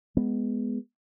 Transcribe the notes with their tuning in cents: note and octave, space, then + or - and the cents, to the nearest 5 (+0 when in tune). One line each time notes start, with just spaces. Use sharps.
G#3 +0 B3 +0